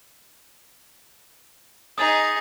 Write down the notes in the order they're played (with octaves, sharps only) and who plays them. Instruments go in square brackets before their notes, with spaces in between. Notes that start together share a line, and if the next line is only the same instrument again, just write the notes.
[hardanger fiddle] D#4 G#4 [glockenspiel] D#6 A6